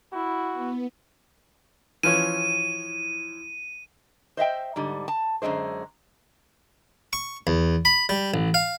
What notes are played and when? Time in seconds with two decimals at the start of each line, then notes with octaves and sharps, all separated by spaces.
0.13 E4 F#4
0.52 B3
2.03 E3 F3 C#4 D#7
4.37 C5 D#5 E5 G5
4.76 G#2 D3 G3
5.08 A5
5.42 F#2 A#2 D3 G#3 C5
7.13 C#6
7.47 E2
7.85 B5
8.09 G3
8.34 A1
8.54 F5